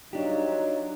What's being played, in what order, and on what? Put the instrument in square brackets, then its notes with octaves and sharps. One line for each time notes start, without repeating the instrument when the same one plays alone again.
[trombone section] F#3 F4 [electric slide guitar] D4 G4 [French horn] D#4